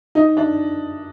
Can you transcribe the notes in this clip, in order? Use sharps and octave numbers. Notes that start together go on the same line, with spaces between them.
D#4
D4